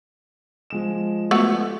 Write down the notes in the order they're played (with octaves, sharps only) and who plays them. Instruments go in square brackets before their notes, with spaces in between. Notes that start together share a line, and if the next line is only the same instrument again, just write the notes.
[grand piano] F3 G#3 E7
[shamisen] A3 B3 F#4